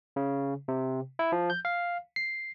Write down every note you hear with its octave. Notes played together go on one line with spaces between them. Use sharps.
C#3
C3
E4
F3
G6
F5
C7